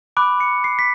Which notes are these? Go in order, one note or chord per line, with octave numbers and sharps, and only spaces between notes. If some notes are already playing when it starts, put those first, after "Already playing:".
B5 D6 F#6 D7
C#7
C7
B6